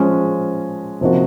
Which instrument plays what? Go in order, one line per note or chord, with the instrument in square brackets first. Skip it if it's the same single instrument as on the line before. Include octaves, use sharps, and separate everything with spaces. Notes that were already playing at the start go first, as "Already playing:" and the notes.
Already playing: [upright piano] F3 G#3 C#4
C3 F3 A#3 D#4 F#4